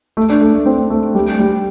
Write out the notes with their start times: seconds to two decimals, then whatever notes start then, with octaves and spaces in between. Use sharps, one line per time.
0.17 A3
0.29 D4
0.41 A3
0.54 A3
0.66 C4
0.90 A3
1.15 G3
1.39 G3